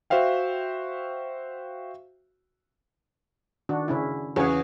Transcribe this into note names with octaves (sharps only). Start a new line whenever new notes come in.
F#4 C5 E5 F5 G5
D#3 D4 F#4
C#3 C#4 E4
E2 C#3 C#4 F#4 G#4 C#5